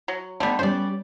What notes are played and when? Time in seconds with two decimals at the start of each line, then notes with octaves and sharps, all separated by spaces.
0.08 F#3
0.40 D3 G3 A3 B3 D#4
0.59 G3 B3 C#4 C5 D5